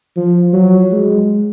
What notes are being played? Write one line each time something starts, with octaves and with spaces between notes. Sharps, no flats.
F3
F#3
G#3